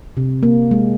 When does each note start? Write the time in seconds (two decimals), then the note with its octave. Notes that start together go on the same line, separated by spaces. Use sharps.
0.17 C3
0.43 A#3
0.71 G#3